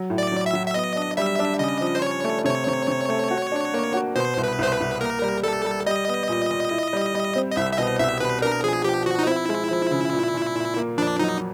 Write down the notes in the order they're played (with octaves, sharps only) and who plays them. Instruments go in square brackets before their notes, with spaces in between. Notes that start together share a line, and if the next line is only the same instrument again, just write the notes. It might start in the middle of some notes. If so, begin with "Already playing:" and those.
Already playing: [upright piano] F#3
A2
[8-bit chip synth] D5
[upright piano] F#3
[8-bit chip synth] E5
[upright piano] F#3
[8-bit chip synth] E5
[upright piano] B3 [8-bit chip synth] D#5
[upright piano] D4
[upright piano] G3 [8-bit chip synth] E5
[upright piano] D4
[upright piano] C#3 [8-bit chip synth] D#5
[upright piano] F3
[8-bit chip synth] C5
[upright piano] F3 [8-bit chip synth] C#5
[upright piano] A3
[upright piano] C3 [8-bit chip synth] C#5
[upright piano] C3
C3
A3
F#4
D4
A#3
F#4
[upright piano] B2 [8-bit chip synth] C5
[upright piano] C2
[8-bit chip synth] B4
[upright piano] C2 [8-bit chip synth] C5
[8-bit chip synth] B4
[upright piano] C2
[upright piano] A#3 [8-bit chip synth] A#4
[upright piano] G3
[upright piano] G3 [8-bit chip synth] A4
[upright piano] G3
[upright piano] G3 [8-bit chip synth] D#5
[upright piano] B3
A#2
A#2
E4
G3
G3
C4
[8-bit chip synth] D#5
[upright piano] C2 [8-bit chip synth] E5
[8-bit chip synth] E5
[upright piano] B2 [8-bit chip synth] D#5
[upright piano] C2 [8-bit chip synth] E5
[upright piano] B2 [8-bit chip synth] B4
[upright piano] D4 [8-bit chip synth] A#4
[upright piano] F3 [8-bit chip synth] G#4
[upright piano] F3 [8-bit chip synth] G4
[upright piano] F3 [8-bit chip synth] F#4
[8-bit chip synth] D#4
[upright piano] C4 [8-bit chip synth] E4
[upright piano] G#3
F3
C#3
A#2
A#2
A#2
A#3
[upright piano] F2 [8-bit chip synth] D4
[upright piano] F#3 [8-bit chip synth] D#4